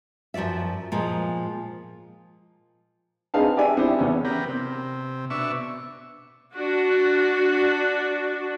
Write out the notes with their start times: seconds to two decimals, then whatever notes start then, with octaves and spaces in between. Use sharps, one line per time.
0.34 F#2 F3 F#4 D5 E5
0.92 A#2 F3 G#3
3.34 C4 D#4 G#4 B4 F5 A5
3.57 G4 D5 E5 G#5
3.77 B3 C4 E4 G4 B4 C5
3.99 E2 C#4
4.25 B3 G4 A#4
4.48 C3
5.30 B2 D4 E5 C#6
6.55 D4 F#4